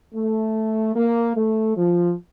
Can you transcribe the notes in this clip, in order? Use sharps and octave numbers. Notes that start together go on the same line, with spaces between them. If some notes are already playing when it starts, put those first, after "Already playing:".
A3
A#3
A3
F3